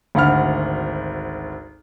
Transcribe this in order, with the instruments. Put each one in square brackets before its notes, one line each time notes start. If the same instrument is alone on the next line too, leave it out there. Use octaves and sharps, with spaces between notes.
[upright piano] G#1 D2 F#5 B5 F6